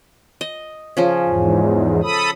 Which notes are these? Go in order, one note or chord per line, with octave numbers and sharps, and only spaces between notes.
D#5
C#3 F3 C#4
E2 G#2
A4 B5 D#6